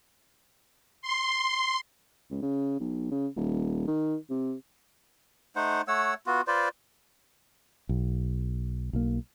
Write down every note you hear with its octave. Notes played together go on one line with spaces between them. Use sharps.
C6
C#2
C#3
B1
C#3
D#1
D#3
C3
A3 D#4 C5 F#5
A3 C#5 F#5 E6
B3 F4 F#4
F4 B4 C5 D5
B1
B1 A#3